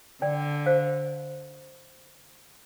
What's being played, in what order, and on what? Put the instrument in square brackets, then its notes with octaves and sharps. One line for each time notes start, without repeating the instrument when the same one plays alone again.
[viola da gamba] D3 [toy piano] D5 G5
[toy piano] C5 F5